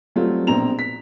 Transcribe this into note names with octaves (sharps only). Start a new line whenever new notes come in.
F#3 G3 A3 C4 F4
A#1 B2 C4 A#5 F7
B6